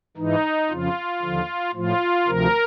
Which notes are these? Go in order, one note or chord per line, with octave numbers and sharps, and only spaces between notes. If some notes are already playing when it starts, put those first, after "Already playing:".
G#2 E3 D#4
F2 C#3 F3 F4
D#2 D3 F3
A2 F3 F4
D2 C3 F3 A#4